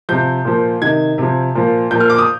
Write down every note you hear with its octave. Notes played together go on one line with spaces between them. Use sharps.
C3 F3 G6
A#2 F3
C3 D#3 G#6
C3 F3
A#2 F3
A#2 F3 G6
F6
D6
D#6